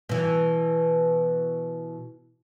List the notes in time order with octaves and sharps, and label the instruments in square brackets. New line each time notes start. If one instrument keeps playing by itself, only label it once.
[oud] B2 E3